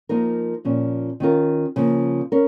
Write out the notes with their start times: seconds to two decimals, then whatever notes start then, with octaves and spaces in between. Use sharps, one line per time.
0.09 F3 A#3 D#4 A#4
0.65 A#2 F3 C#4
1.20 D#3 C#4 F4 A#4
1.76 C#3 F3 A#3
2.32 C#4 A#4